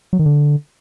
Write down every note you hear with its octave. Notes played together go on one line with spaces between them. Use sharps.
F#3
D#3
D3